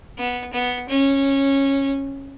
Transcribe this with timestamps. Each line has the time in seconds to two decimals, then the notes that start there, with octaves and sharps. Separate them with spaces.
0.18 B3
0.53 B3
0.89 C#4